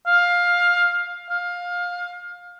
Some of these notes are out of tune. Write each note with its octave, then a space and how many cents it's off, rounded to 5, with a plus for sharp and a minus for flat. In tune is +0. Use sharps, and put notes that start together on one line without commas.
F5 +15
F5 +20